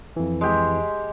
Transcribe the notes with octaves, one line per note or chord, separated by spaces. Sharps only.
F2 E3
G#3 G4